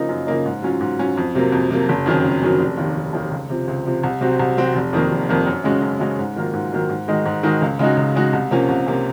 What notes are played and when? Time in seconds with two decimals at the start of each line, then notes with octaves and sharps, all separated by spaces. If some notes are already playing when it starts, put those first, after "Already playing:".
Already playing: C#3 F3 A#3 D#4
0.09 F#2
0.27 C#3 F3 A#3 D#4
0.46 G#2
0.62 F#3 C#4 F4
0.81 G#2
0.99 F#3 C#4 F4
1.17 F2
1.35 C3 F#3 A#3
1.52 F2
1.70 C3 F#3 A#3
1.89 F#1
2.06 F2 D#3 F#3 C#4
2.24 F#1
2.43 F2 D#3 F#3 C#4
2.59 F1
2.77 D#2 D#3
2.96 F1
3.13 D#2 D#3
3.31 C#2
3.50 C3 F3
3.68 C#2
3.86 C3 F3
4.04 C2
4.21 C3 F#3 C4 F#4
4.39 C2
4.57 C3 F#3 C4 F#4
4.75 F1
4.93 F2 D#3 A#3
5.11 F1
5.29 F2 D#3 A#3
5.47 F#2
5.64 C#3 G#3 C#4 F#4
5.82 F#2
6.00 C#3 G#3 C#4 F#4
6.19 G#2
6.36 D#3 F#3 A#3 F4
6.53 G#2
6.72 D#3 F#3 A#3 F4
6.89 G#2
7.08 D#3 G#3 D#4 F#4
7.26 G#2
7.43 D#3 G#3 D#4 F#4
7.61 C#2
7.79 C#3 G#3 D#4 F#4
7.97 C#2
8.15 C#3 G#3 D#4 F#4
8.33 C2
8.51 C3 F3 A#3 C#4
8.69 C2
8.86 C3 F3 A#3 C#4